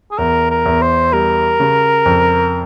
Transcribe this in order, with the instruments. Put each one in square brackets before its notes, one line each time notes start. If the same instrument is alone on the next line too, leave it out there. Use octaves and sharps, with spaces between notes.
[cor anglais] G#4
[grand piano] E2 [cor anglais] A#4
[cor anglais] A#4
[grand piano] E2
[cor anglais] C5
[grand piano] G3 [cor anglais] A#4
[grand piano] C#3
F2